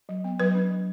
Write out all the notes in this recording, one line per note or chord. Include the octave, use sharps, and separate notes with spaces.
F#3
B3
F#3 B4
D4
F#3